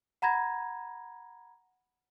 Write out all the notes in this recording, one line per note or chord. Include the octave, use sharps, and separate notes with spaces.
F#5 A#5 B5 G#6 A#6